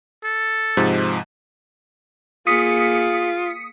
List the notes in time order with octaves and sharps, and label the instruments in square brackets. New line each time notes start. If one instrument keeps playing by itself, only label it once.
[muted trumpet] A4
[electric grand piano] G#2 C3 F3
[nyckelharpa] A#3 G#4 [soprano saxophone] F4 [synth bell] D#6 B6 C#7